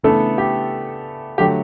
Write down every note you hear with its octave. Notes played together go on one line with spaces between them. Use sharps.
C#3 E3 A3 B3 D4 A4
G4
D3 F#3 A3 G4